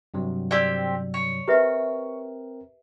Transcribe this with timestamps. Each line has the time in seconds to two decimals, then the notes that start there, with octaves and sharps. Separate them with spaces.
0.14 G2 C3 F#3
0.51 C4 G4 D5 G#5 E6
1.14 C#5
1.48 C4 G4 A#4 B4 E5